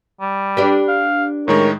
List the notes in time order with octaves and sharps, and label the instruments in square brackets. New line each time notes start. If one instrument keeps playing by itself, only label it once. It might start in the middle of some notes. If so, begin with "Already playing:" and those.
[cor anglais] G3
[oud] D4 G4 B4
[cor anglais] F5
[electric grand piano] A2 D#3 G#3 [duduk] A#4 [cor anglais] C#5